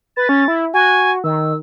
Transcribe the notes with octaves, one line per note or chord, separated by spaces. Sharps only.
B4 A6
C#4
E4
F#4 G#5
D#3 E6